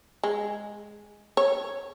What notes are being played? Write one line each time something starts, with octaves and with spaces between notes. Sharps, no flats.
G#3
C#5